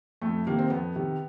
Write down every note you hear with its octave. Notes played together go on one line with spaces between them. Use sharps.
F2 A3
C3 D#3 A#3
C4
F2 B3
C3 D#3